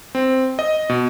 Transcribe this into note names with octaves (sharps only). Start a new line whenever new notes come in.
C4
D#5
B2